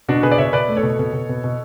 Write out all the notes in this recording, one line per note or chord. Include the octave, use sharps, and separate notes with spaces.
B2 D4 F#4
B2 G#4 B4
D5
B2 C#5 E5
B2 B4 D5
A3
A4 C#5
B2
B2
B2
B2
B2